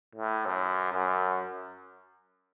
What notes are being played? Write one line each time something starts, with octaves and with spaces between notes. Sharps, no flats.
A2
F#2
F#2